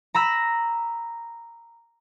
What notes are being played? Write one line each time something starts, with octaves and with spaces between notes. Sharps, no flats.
A#5 B5 E6 A#6